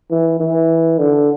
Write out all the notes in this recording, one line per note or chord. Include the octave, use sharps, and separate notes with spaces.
E3
E3
D3